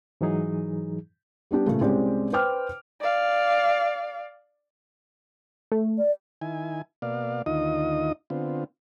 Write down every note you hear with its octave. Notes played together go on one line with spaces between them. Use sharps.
G#2 E3 F#3 D#4 G#4
G3 B3 D4 G4
A#2 C#3 A3
C2 G#3 C4 C#4 G4 D5
B4 C5 G5 D6 F6
D5 F5
A3
D5
D#3 E4 G#5
B2 A#3 D5 F5
D2 D#3 D#4 F4 D#5 D#6
D3 B3 C4 F4